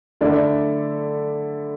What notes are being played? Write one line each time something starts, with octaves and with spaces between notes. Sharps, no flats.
D3 A3 E4 A4 D5